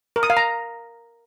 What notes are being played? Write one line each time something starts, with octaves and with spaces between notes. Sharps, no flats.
A#4
D#6
F5
A#5